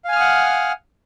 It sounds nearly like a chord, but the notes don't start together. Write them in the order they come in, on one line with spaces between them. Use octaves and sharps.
F5 G#5 F6 D#6 F#5